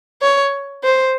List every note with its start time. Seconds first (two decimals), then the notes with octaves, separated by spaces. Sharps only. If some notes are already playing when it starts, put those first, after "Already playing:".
0.22 C#5
0.83 C5